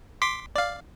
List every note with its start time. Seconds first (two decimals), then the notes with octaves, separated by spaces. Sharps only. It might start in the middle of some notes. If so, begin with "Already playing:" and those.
0.22 C6 D6 B6
0.56 D5 F5